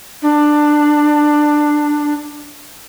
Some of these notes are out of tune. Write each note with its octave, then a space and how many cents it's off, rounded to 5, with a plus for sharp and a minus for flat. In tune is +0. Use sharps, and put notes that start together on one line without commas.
D4 +15